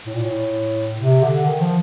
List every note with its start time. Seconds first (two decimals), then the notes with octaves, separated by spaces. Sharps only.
0.06 A2
0.14 A#2
0.23 A2
0.99 C3
1.22 D3
1.45 D#3
1.61 F3